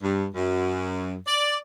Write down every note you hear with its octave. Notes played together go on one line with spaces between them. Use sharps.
G2
F#2
D5